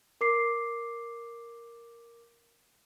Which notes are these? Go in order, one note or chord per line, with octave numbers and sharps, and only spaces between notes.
A#4 D6 C7